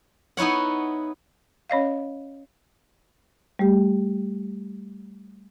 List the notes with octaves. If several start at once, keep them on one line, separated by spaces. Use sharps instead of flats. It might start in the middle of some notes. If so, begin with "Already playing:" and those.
B3 D#4 E4 C#5 F#5
C#4 C#5 D#5 F5
G3 A3 G4